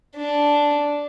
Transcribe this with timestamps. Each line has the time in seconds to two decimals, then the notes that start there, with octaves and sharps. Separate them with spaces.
0.17 D4